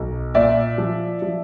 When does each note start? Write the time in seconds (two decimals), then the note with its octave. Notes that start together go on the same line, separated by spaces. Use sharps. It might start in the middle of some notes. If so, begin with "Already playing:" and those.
Already playing: B1
0.34 A#2 D5 E5
0.78 F3
1.22 F3